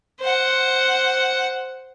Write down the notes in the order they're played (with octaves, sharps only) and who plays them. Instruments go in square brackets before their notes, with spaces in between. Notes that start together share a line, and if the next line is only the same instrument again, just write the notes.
[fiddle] C5 F#5